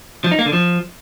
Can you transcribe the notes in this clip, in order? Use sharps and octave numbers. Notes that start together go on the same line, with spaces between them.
F3
D#4
A#3
D3
F3